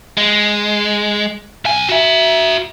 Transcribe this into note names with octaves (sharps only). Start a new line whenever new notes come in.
G#3
B1 G#5
F#4 E5